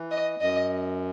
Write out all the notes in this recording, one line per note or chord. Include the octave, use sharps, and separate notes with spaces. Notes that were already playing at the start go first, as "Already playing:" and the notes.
Already playing: E3
D#5
F#2 D#5